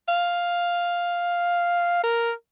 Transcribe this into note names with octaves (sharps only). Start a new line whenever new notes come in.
F5
A#4